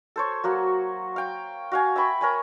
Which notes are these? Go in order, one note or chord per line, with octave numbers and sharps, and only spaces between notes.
A4 C5 C#5
F#3 A#3 F#4
F5 G5
F#4 F5 G#5
E5 G5 B5 C#6
A#4 C#5 G#5